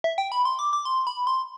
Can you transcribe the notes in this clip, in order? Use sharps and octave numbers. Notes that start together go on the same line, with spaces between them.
E5
G5
B5
C6
D6
D6
C6
B5
C6